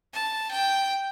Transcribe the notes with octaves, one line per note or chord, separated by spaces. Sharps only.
A5
G5